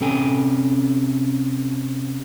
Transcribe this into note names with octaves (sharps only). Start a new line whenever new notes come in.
C3 C#4 A4 G5 G#5